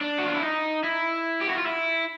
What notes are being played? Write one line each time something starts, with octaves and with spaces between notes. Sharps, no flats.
D4
F#4
F4
E4
D#4
E4
G4
F#4
F4
E4